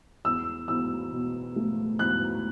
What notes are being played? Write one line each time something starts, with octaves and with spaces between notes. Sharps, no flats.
E2 E6
E2 E6
B2
A3
E2 F#6